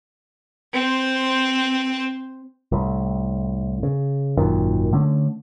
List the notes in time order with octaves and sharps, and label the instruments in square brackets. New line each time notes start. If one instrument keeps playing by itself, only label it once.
[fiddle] C4 C5
[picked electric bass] C2 A2
C#3
G#1 F#2 A#2 D#3
D3 A3 C#4